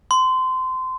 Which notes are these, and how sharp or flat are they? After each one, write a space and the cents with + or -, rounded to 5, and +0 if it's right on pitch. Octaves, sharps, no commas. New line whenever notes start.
C6 -25